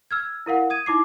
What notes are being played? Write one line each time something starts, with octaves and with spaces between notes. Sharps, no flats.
E6 F6 G#6
E4 A#4 F5 F#5
D#6 G#6 D#7
D#4 E4 D6 C7